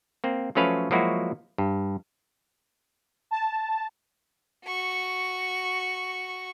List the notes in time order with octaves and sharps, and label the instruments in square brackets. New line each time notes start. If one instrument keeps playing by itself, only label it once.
[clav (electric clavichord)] A#3 C4
F3 F#3 A3 C#4 B4 F5
F3 F#3 G#3 A#3 E4 F#4
G2
[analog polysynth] A5
[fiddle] F#4 C#6